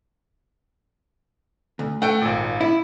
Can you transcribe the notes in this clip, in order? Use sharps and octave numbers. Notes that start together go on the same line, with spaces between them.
D2
A3 F#5 G5
G#1 A#2
E4